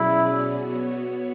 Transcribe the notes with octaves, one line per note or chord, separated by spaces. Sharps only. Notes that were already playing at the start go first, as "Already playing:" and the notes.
Already playing: B2 F#3 C#4 E4 G#4 D5
B3 F#4 C#5